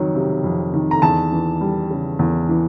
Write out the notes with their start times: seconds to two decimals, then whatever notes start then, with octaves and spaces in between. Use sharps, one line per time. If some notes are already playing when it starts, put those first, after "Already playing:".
Already playing: F2 D#3 F#3
0.15 C3
0.44 F2
0.74 D#3
0.91 A#5
1.02 E2 A5
1.32 E3
1.61 G3
1.90 C#3
2.19 E2
2.49 E3